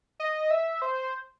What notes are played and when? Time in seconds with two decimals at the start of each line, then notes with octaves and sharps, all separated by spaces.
0.20 D#5
0.51 E5
0.82 C5